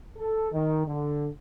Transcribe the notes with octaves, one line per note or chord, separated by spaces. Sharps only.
A4
D#3
D3